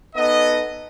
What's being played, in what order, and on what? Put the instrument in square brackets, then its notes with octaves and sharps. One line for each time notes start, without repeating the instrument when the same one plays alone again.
[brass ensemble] B3 D#4 A4 D#5